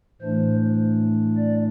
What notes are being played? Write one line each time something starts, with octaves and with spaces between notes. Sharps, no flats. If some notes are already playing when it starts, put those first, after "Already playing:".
A2 E3 A3 D4 C5
D5